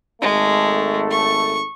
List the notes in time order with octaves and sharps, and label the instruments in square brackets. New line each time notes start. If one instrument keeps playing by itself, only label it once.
[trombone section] G#1 A3 A4 [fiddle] G#3
[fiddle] C#6